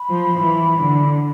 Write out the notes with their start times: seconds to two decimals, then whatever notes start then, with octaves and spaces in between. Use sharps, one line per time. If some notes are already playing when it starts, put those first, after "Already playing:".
Already playing: B5
0.09 F3
0.38 E3
0.80 D3